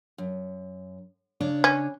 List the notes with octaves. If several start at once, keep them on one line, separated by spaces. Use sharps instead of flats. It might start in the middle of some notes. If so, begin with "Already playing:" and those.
F#2
C#3 D4 C#5
C#4